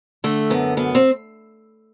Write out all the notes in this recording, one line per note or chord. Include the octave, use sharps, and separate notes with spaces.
D3 A3
F#2 B3
F#2 B3
C4